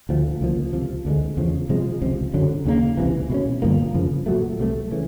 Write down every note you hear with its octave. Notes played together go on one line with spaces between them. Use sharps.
D2 D3 F3 A3
C#2 C#3 F3 A#3
C#2 C3 F3
D2 D3 F3 G#3
E2 C#3 F3
C3 F3 G#3
C#2 C3 F3
F#2 D3 F#3
D#2 C#3 F#3 A#3
C#2 C3 E3
B2 G#3 C#4
G2 D3 F3 A#3
F#2 C#3 F3
A#2 F#3 A3
C2 C3 F3 A3
C#3 E3